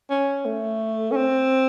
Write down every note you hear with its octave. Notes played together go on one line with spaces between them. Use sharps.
C#4
A3
C#4
C4